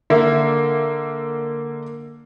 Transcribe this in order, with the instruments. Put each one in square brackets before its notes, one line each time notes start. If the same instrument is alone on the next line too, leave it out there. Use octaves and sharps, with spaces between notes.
[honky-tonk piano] D3 A#3 E5